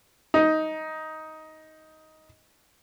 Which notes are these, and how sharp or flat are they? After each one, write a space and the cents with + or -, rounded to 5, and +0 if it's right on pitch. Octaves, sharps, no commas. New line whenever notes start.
D#4 +10